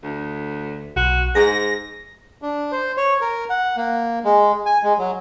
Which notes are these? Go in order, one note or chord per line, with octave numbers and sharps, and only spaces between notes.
D2
B1 F#4
G#2 G#4 A#6
D4
C5
C#5
A#4
F#5
A#3
G#3
G#5
G#3
F#3